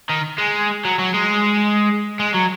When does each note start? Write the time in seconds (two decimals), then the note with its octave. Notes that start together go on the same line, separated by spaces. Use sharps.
0.09 D#3
0.38 G#3
0.85 F#3
0.99 F#3
1.14 G#3
2.20 G#3
2.35 F#3